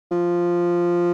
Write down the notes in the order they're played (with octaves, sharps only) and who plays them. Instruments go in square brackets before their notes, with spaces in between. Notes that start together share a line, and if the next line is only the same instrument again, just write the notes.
[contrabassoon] F3